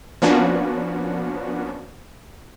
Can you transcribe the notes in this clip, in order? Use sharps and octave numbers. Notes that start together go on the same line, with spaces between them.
F3 A#3 B3 C#4 D4 F#4